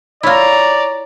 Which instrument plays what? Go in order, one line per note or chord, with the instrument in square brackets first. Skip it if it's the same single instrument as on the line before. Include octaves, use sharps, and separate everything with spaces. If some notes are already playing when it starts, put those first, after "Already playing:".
[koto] E4 F4 [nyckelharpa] C#5 A#5 [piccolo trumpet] D5